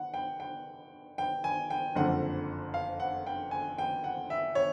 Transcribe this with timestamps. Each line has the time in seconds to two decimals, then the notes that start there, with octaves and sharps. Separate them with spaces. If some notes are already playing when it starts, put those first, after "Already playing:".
Already playing: F#5
0.14 G5
0.40 G5
1.18 G5
1.44 G#5
1.70 G5
1.95 F#1 F2 D3 F#5
2.74 F5
3.00 F#5
3.27 G5
3.51 G#5
3.78 G5
4.04 F#5
4.30 E5
4.55 C#5